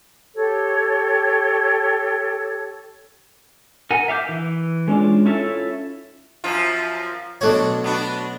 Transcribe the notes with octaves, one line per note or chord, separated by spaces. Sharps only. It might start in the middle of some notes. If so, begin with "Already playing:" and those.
G4 A4 C#5
A#4 F#5 G#5
E5 F5 D6 G6
E3
G#3 C#4 D4 F4
C#4 E4 F4 A4 E5
F#2 F3 F4
B1 A3 D4 F#4 C#5
B3 D4 F#4